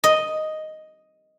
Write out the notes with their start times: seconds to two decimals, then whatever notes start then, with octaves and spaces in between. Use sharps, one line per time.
0.04 D#5